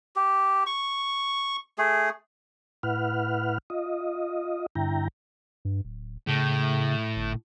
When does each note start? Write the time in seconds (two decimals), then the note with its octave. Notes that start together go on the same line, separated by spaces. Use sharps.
0.16 G4
0.67 C#6
1.78 A3 G#4
2.83 A2 E4 B4 F#5 F6
3.70 F4 D#5
4.75 G2 D3 E4 G5 A#5
5.65 G2
5.85 D1
6.27 A2 C#3
7.16 G1